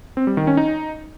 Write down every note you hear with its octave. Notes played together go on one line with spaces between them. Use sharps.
C4
G3
D#3
C#4
D#4